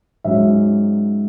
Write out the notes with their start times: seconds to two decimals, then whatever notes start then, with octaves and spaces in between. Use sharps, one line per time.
0.24 G#2 F#3 C#4 E5